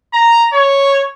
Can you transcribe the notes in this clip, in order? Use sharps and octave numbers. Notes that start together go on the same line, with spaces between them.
A#5
C#5